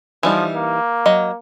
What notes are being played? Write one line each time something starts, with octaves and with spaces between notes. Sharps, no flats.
E3 F3 G3 D#4
A#3
F#3 D#5